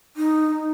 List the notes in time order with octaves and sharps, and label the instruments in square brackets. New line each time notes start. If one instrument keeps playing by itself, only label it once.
[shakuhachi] D#4